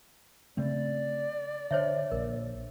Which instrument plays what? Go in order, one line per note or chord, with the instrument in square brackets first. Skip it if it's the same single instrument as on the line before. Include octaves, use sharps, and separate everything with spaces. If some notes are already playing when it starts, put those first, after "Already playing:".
[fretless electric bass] C#3 A3 C4 [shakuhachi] D5
[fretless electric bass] D3 [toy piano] C5 C#5 E5
[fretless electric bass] A#1 [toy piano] A#4